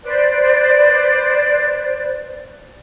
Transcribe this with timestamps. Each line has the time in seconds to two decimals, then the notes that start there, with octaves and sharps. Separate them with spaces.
0.03 B4 C5 D5